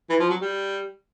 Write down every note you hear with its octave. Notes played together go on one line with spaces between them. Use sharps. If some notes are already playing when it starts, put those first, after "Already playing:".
E3
F3
F#3
G3